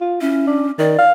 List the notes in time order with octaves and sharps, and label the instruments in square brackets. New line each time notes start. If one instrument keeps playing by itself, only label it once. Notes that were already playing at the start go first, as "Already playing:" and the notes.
[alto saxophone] F4
[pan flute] C#4 [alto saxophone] E4
[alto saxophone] D4
[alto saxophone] D#3 [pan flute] D5
[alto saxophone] F5